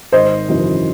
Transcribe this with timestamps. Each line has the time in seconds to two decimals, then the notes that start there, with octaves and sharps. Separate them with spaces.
0.12 G#1 C5 D#5
0.49 F#2 C#3 E3